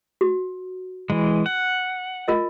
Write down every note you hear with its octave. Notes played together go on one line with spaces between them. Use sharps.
F#4
E3 G#3
F#5
F4 A#4 D#5